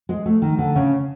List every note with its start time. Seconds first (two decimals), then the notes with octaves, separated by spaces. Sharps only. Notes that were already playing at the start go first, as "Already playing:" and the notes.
0.09 G#3
0.26 A3
0.42 D#3
0.59 D3
0.76 C#3